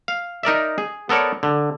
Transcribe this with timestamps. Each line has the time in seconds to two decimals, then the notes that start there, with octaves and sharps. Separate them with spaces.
0.08 F5
0.43 D#4 A#4 D5 E5
0.78 G#4
1.09 B3 A4 A#4 C#5 D5
1.43 D3